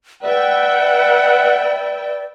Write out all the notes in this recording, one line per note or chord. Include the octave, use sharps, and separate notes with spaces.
B4 D5 E5 F#5 G5